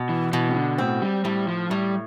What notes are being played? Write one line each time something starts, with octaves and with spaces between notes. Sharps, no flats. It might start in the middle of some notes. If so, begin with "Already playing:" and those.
Already playing: B2
E3
B2 E3
C3
D3
A2 C4
G3
A2 G3
F3
A2 G3